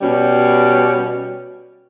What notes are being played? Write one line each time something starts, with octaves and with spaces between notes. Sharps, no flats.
B2 G3 C#4